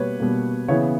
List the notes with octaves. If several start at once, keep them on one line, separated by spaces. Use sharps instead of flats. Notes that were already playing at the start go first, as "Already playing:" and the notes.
Already playing: B2 G3 A#3 B4 C#5
B2 G3 A#3
C#3 E3 B3 C#5